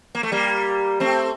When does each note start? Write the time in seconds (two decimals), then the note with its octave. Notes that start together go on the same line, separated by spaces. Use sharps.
0.15 A#3
0.23 A3
0.32 G3 A#3
1.00 A3 C4